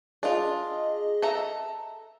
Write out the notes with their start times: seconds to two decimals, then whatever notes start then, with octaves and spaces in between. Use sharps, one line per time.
0.23 D4 F4 G#4 D#5
1.22 A4 E5 A#5